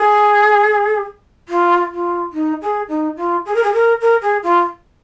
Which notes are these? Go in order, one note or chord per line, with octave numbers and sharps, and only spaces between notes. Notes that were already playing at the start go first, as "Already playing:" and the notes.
Already playing: G#4
F4
F4
D#4
G#4
D#4
F4
G#4
A#4
G#4
A#4
A#4
G#4
F4